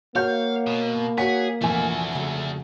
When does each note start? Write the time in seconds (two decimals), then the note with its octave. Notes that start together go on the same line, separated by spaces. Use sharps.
0.15 A#3 F#4 C#5 F5 G6
0.66 B2
1.18 F#4 G#4 C#5 F#5 B6
1.61 F1 A#2 E3 A3 F#4 G#5
2.15 C#3 F#3